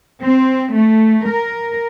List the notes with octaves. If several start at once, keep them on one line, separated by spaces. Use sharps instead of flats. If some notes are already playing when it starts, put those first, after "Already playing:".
C4
A3
A#4